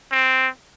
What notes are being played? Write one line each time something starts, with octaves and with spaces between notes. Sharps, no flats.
C4